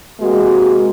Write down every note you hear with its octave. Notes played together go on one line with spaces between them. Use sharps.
C3 G#3 A#3 F#4